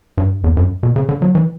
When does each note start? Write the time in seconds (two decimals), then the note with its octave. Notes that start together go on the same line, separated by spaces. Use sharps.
0.17 G2
0.44 E2
0.57 F#2
0.83 B2
0.96 C#3
1.09 D3
1.22 F#3
1.35 E3